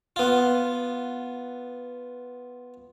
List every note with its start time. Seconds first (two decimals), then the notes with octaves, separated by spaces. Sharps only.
0.16 B3 F4